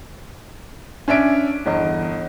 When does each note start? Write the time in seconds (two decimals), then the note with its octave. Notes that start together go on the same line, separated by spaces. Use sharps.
1.08 C#4 D4 E5 D7
1.66 G1 E2 D#5